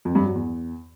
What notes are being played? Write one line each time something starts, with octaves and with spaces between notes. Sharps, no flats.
F2
G2
F#3
E2